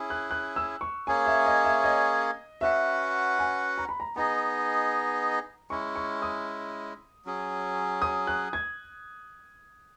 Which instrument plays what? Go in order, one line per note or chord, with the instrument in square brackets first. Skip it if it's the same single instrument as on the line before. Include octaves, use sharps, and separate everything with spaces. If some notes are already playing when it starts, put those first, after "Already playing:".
Already playing: [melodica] C#4 E4 G#4
[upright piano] F#6
F#6
E6
C#6
[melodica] A#3 C#4 G#4 C#5 [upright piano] G#5
[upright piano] E5
D#5
E5
D#5
[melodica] C#4 F#4 B4 F#5 [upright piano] E5
[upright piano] G#5
A#5
B5
A#5
[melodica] B3 D#4 G#4 D#5 [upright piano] A#5
[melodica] G#3 C#4 E4 [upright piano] C#6
[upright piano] C#6
D#6
[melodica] F#3 C#4 G#4
[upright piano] D#6
F#6
G#6